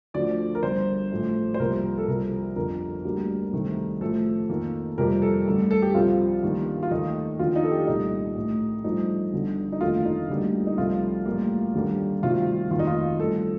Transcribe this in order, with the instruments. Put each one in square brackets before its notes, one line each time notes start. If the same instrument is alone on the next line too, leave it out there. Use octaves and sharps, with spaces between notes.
[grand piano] D2 D3 F3 D5
A#4
G1 G2 D3 C5
A1 A2 F3 A3
C5
C2 C3 F3 A#3 A#4
A4
C2 C3 F3 A#4
G1 F2 D3 A#4
D2 D3 G3 A#3
C2 C3 D#3 A3
A1 A2 F3 A3 A4
F2 D#3 A#3
F2 C3 G3 A#4
A4
A1 G2 D3
A4
G4
C2 C3 F3 F4
G2 D#3 G3 A#3
F4
D#2 D#3 A3 D#4
D#2 D3 F3 F4
D#4
A4
G4
C2 A#2 A3 D#4
A1 A2 A3
A1 G2 F3 A3 D#4
G1 G2 D3
D#4
F1 D#2 D3 A3 F4
D#4
D2 D3 G3 A#3
D#4
C2 C3 F3 A3 F4
A1 A2 G3 A#3
D#2 D3 G3 A#3
D2 C3 D#3 G3 F4
F1 D#2 D#3 F4
D#4
F4
A1 G2 F3 A4